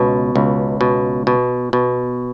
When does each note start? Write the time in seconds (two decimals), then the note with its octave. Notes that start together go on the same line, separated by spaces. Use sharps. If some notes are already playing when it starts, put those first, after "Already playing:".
Already playing: C#2 B2
0.36 C#2
0.81 B2
1.27 B2
1.73 B2